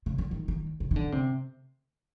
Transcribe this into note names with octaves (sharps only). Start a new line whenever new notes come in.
C#3
D3
D#3
D#3
C#3
D#3
D3
C3